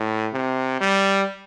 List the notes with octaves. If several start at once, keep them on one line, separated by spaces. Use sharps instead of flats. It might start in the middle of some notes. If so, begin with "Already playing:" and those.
Already playing: A2
C3
G3